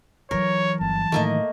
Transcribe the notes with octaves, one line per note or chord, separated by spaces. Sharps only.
E3 F#3 A#4 C#5
G1 A5
A2 D#3 A3 A#3 D#5